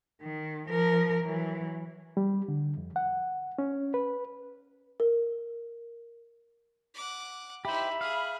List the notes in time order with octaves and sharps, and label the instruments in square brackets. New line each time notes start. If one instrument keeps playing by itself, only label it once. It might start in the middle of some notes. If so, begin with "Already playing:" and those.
[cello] D#3
F3 A#4
E3 F#3
[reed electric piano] G3
D3
F2
F#5
C#4
B4
[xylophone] A#4
[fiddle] F#5 D6
[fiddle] D#4 E4 [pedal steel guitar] G4 C5 [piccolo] E5 [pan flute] B5
[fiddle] G#4 [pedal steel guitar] F5